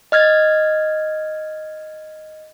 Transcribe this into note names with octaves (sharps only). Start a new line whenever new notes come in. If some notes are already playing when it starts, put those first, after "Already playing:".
D#5 F6 G#6 A6